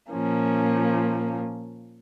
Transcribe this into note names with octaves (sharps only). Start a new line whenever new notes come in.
A#2 F3 A#3 C#4